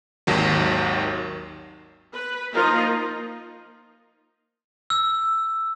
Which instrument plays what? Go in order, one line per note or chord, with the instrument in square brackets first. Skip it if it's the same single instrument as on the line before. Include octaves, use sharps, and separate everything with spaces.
[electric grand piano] G#1 D#2 D#3 F#3
[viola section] B4
F3 A#3 D#4 F4 A#4
[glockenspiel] E6